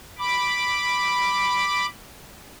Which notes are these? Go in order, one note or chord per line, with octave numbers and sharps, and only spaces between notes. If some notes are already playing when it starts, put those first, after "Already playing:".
B5 D6